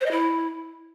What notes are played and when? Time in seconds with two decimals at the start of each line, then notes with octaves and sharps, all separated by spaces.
0.01 C5
0.06 D#5
0.11 E4